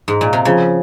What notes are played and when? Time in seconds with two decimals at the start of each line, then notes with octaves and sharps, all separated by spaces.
0.08 G#2
0.21 A#2
0.33 C3
0.45 C#3 F3